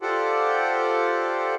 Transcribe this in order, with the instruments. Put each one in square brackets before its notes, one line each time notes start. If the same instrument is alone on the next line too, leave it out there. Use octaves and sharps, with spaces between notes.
[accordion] F4 G4 A4 C5 D5 F#5